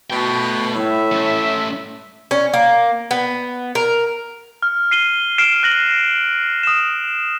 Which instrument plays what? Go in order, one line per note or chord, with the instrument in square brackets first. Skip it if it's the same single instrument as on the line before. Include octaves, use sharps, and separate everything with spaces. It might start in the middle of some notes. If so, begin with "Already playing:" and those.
[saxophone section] B2 [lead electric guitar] A3 G5
[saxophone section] A2 [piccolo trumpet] E5
[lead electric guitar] A3 C#4
[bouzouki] C#4
A#3
B3
A#4
[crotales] F6
C7 D#7 G7
F6 C7 D7 E7
F#6 A#6 F#7
D#6 E7